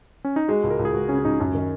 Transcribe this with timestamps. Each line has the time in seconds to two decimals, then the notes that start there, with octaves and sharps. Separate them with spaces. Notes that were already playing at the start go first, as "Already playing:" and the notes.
0.25 C#4
0.36 D#4
0.48 G#3 F#4
0.63 C#2
0.70 A#4
0.79 C#2
0.85 G#4
0.93 C#2 F#4
1.09 C#3 C#4
1.19 C#4
1.25 C#2 D#4
1.40 F#2 C#4
1.54 D#3